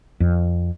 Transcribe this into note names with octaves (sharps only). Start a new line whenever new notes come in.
F2